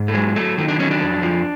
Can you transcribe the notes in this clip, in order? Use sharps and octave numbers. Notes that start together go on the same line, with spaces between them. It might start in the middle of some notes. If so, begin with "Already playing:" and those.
Already playing: G#2
A3
F#3 G#3
F#3 A3
D#3 A3
D4
F#3 C#4
D4
F2
F3